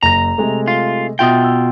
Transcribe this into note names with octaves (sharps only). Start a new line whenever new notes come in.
F#1 A#5 A#6
C3 G#3 A3
F4
B2 F4 E5 G5 D#6
E6